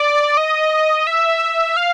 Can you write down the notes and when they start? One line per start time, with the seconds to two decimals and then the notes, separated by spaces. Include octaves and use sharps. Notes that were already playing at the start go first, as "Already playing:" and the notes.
Already playing: D5
0.37 D#5
1.07 E5
1.77 F5